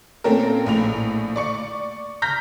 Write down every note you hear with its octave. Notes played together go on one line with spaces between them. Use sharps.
A#2 A3 C4 C#4 A4 A#4
A#1 A2 F7
D5 C#6 C#7
A#5 F6 G6 A#6 B6